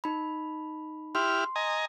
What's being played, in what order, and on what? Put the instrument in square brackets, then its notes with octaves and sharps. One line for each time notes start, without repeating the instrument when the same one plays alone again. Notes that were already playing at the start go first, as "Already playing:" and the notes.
[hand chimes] D#4 B5
[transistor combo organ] E4 G4 F6 [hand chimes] C6
[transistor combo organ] D#5 G#5 A#5